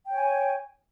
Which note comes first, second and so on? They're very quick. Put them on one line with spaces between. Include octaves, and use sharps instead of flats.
G5 C#5 G#5